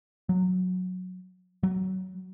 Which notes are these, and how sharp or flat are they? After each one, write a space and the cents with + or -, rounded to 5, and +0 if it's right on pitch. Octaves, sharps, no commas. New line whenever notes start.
F#3 -10
F#3 +20